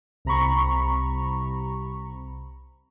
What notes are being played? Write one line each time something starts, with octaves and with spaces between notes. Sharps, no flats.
C2 C3 A#5 B5 C#6